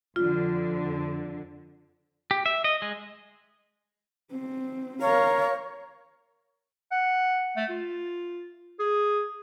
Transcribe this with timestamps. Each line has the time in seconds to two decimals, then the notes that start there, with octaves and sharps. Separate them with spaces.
0.16 F2 D3 F4
2.31 G4
2.46 E5
2.64 D#5
2.82 G#3
4.32 C4
5.01 A#4 C#5 F5
6.91 F#5
7.56 A3
7.69 F4
8.79 G#4